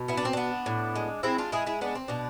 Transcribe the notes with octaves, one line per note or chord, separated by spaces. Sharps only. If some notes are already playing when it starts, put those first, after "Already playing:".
Already playing: B2
B3 E4
D4
C4
B3 D4
A2
G#3
G#3 C4 E4
D4 F4
G#3 E4 G#4
E4 G#4
B3 D4
C4
B2 D4